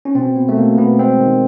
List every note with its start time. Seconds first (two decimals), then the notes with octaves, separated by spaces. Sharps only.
0.05 C#4
0.15 B2 C4
0.36 B2 B3
0.49 A3
0.57 B2 A#3
0.78 B2 B3
0.99 G#3 C4
1.20 D#3